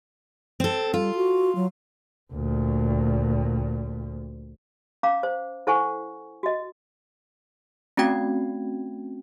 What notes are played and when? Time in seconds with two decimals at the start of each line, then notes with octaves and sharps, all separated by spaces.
0.60 C4 A4
0.94 G3 F4
1.15 F#4
1.55 F#3
2.32 D2 A#2
5.03 C#4 F5 A#5 D6
5.23 C5
5.67 E4 A4 C5 F#5 G#5 C#6
6.43 F#4 D#5
7.97 A3 C4 C#4 F#4 G5 G#6